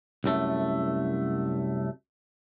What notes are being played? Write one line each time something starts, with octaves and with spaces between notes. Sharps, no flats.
C2 F#2 A3